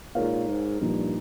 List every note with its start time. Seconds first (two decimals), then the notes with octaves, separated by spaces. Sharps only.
0.15 A#2 G#3 D#4 A#4 C#5 F5
0.48 G#2
0.81 G2 A#2 F3 A#3 D#4